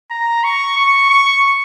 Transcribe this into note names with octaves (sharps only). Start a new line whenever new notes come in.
A#5
C#6
C#6
C#6